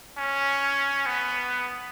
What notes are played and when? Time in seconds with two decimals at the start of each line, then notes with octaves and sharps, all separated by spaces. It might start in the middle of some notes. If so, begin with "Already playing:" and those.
0.17 C#4
1.06 B3